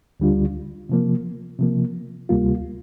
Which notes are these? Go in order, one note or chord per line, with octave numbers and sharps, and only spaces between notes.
D2 D3 G3 D4 F4
C3 F3 A#3
C3 F3 A#3
D2 C3 G3 A#3 F4